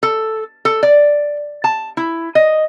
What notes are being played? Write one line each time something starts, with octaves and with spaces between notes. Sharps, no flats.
A4
A4
D5
A5
E4
D#5